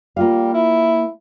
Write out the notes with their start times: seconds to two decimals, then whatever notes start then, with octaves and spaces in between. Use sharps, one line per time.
0.17 G3 A#3 F4 F5
0.54 E4